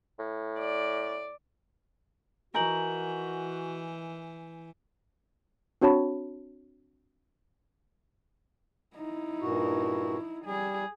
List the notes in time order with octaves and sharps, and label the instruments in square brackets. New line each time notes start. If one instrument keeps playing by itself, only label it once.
[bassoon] A2
[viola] D5
[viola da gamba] E3 [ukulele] D#4 A#4 [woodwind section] F#4 [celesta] G#5 G6 F#7
[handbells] C4 D4 F#4 C#5 A5 B5
[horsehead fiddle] D#4 E4
[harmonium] G2 A#2 F#4
[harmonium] G3 [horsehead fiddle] G#4